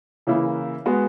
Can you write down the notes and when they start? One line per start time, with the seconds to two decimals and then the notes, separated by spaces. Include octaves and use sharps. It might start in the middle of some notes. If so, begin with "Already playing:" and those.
0.27 C#3 E3 A#3 E4 A#4
0.86 G#3 B3 F#4 B4